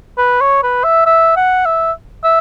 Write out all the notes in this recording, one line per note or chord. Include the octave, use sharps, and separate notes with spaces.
B4
C#5
B4
E5
E5
F#5
E5
E5